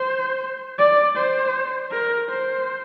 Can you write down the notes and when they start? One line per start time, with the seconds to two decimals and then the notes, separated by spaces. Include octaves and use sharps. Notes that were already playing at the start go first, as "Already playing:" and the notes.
Already playing: C5
0.78 D5
1.16 C5
1.91 A#4
2.29 C5